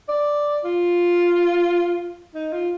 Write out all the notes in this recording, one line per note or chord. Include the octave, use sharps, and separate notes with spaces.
D5
F4
D#4
F4